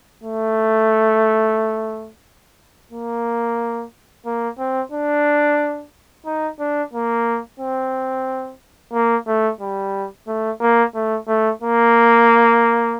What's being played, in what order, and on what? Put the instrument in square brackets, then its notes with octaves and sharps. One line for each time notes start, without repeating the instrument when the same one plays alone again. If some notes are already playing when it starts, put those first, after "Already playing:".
[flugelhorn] A3
A#3
A#3
C4
D4
D#4
D4
A#3
C4
A#3
A3
G3
A3
A#3
A3
A3
A#3